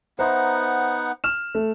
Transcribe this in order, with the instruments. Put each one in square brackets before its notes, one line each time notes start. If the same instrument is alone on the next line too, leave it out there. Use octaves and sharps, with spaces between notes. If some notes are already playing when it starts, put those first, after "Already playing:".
[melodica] B3 D#4 F#5 [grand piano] C5 E5 A#5
[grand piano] F6 E7
A3